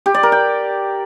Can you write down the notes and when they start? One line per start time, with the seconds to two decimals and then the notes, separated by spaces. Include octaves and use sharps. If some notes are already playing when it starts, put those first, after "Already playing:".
0.06 G4
0.14 D5
0.23 A#4
0.32 G5